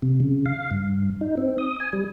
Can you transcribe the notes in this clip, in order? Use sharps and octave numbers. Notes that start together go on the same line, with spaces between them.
C3
C#3
F5
G2
D#4
C4
D#6
G#5
G3